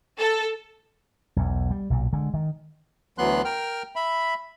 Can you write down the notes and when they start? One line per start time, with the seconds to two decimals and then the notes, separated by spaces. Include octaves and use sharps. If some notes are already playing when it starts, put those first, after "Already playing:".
0.18 A4
1.36 B1 E2
1.71 G3
1.90 B1 A#2
2.13 D3 G#3
2.34 D#3
3.18 D2 E3 F#3 B3 C6 F#6
3.45 A#4 G5 F6
3.96 E5 B5